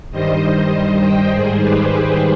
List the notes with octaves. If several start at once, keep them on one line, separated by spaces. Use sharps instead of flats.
G2 D#3 G3 C5 D#5
D#5 G5
G#2 D#3 G3 G#4 C5
G4 B4
G4 B4